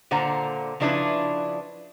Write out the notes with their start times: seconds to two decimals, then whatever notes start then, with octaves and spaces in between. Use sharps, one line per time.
0.11 A#2 D3 C5 F#5 A#5
0.80 C#3 F3 D4 E4 B4